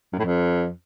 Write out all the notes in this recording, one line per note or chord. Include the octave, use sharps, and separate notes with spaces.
F#2
A2
F2